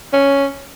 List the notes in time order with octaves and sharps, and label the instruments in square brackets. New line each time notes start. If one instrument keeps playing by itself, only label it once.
[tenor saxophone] C#4